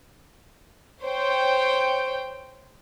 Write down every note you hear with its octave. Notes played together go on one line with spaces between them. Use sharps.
C5 C#5 G5